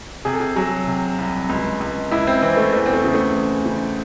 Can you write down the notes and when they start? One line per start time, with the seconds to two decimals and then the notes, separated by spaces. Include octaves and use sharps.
0.25 C3 G#4
0.33 A4
0.41 G#4
0.56 F#3 G#4
0.87 C3
1.19 C2
1.49 C#2
1.80 C#2
2.11 C#2 E4
2.27 C4
2.42 E3 C4
2.57 A3
2.73 E2 A3
2.86 C4
2.93 A3
3.04 C#3
3.14 A3
3.34 E3
3.66 C#3